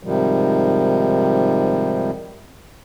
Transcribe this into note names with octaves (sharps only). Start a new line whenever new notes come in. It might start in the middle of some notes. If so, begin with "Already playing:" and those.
G#2 C3 D#3 F3 G3